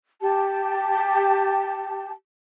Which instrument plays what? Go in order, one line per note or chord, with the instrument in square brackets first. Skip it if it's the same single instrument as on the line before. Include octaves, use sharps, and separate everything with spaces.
[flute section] G4 A5